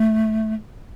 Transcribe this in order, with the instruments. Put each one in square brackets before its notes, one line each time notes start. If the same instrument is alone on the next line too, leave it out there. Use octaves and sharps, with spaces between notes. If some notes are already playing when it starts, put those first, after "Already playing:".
Already playing: [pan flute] A3